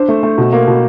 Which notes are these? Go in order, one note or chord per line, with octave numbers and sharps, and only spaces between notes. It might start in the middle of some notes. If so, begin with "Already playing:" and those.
Already playing: D4 C5
A3
A3
B2
A#3
B2